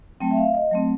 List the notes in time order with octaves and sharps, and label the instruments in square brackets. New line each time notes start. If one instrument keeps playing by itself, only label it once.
[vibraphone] F#3 A3 C4 G5
E5
F5
D#5
F#3 A3 C4